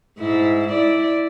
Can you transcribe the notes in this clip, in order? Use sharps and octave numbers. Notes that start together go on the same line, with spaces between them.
G#2 E4
E4 D5